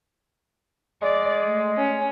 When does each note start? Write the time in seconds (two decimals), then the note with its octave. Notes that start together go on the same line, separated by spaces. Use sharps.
1.02 G#3 D5
1.43 A3
1.77 C#4